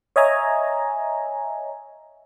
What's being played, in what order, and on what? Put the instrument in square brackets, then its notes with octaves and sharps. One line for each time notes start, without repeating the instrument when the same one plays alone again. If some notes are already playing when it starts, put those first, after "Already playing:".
[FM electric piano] C#5 D#5 E5 G#5 A#5